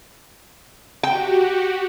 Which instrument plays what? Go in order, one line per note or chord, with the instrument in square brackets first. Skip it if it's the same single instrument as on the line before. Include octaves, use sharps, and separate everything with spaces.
[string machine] F#4 G4 [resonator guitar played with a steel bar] G5